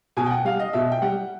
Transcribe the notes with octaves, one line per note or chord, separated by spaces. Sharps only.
B2 G#5
G5
F#5
G3 F5
D#5
B2 E5
G5
G3 F#5